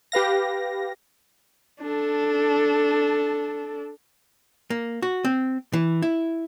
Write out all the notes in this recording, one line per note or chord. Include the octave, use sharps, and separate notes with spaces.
G4 B4 F5 A#6
D4 A4
A#3
F#4
C4
E3
E4